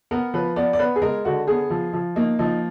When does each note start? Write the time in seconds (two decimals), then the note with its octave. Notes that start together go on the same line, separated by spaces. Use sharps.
0.11 B3 A#4
0.34 F3 B4
0.56 B3 D5
0.73 D5
0.79 B3 B4
0.96 G#4
1.02 G#3 A#4
1.25 D3 F#4
1.47 B3 G#4
1.70 F3
1.93 F3
2.16 A#3 D#4
2.39 F3 D#4